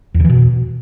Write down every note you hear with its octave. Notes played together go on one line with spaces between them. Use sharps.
E2
C#3
E3
B2